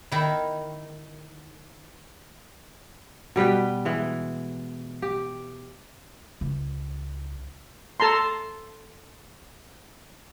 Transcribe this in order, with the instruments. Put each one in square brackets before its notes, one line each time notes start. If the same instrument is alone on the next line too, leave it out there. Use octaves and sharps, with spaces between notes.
[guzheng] D#3 E4
[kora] B2 G3 B4 G5
E3 G#3
G4
[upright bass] C#2
[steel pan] A4 A5 A#5 C6